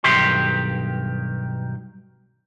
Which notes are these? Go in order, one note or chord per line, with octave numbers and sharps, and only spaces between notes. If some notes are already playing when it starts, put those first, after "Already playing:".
B1 G2 D#3 G4 C6